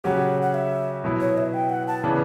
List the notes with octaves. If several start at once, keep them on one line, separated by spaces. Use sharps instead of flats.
C#3 F#3 C#4 G4 F#5
F#5
E5
B2 F#3 B3 E4
C#5
E5
G5
F#5
A5
C#3 E3 B3 D4